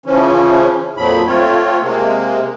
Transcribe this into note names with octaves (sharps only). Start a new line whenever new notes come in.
C#3 E3 F3 C#4
F2 A#2 F3 F#3 B5
A3 C4 F4 C#5
C3 G#3 A#3